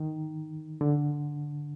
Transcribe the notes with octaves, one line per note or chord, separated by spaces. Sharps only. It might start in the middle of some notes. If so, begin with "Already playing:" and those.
Already playing: D#3
D3